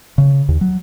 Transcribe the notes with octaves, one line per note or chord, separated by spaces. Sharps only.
C#3
D#2
F#3